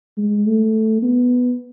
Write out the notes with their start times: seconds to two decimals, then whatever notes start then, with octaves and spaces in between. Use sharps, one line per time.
0.17 G#3
0.46 A3
1.02 B3